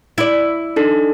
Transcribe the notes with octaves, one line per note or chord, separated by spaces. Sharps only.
E4 D5
D4 D#4 A4